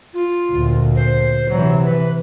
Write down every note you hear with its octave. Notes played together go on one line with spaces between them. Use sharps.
F4
D2 A#2
C5
C3 E3 F#3
B4